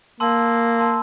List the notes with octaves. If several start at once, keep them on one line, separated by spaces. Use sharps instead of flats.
A#3 A5 C6 E6
A5 C6 E6